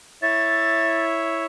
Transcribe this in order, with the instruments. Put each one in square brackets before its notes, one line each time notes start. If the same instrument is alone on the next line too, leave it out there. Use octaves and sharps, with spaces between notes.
[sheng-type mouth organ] E4 C#5 E5 [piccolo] A6